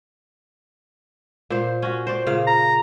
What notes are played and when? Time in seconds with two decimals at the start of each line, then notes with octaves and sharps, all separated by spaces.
1.50 A#2 C5
1.82 C#4 F#4
2.07 C5 D5
2.26 A#2 C#3 F5
2.47 A#5